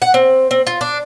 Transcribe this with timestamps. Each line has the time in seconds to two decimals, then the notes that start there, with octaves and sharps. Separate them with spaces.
0.02 F#5
0.14 C4
0.51 C4
0.67 F4
0.81 D4